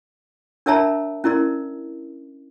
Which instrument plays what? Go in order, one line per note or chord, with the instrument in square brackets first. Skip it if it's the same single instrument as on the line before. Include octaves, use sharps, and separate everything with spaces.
[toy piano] D4 A#4 C#5 E5 A5 A#5
C#4 E4 A#4 D5